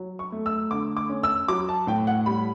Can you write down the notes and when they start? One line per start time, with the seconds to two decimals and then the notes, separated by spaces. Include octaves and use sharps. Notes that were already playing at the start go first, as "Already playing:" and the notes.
Already playing: F#3
0.19 C#6
0.32 A3
0.46 E6
0.71 D3 D6
0.97 D6
1.09 C#4
1.23 E6
1.48 F#3 D6
1.69 A5
1.87 A2 G5
2.07 F#5
2.26 G3 B5